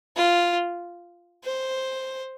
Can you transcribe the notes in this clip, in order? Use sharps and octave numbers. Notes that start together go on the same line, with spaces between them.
F4
C5